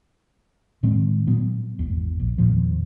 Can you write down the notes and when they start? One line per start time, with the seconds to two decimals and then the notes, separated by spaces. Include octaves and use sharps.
0.83 A2 D#3 G#3 C4
1.27 A#2 F#3 B3
1.79 G#1 E2
2.20 A#1
2.38 E2 A#2 D#3 F3